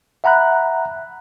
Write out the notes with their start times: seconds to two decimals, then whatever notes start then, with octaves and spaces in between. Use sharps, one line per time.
0.24 E5 F#5 A#5 B5 F#6